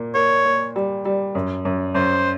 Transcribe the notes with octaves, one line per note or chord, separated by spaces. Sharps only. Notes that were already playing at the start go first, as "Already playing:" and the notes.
Already playing: A#2 A#3
A#3 C#5
A#3
G3
G3
F#2
F#2
F#2 C5